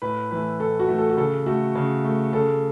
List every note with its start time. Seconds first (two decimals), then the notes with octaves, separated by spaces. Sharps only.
0.02 A2 B4
0.31 E3 A3 B4
0.60 A2 A4
0.80 F#4
0.89 E3 A3
0.98 A4
1.10 F#4
1.17 C#3 A4
1.46 A3 F#4
1.75 C#3
2.04 A3
2.33 C#3 A4